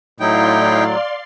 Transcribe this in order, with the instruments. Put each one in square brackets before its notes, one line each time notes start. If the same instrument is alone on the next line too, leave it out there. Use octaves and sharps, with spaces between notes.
[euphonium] A2 [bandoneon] F#3 [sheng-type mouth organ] D#4 E4 G5 [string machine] D5 F5 C6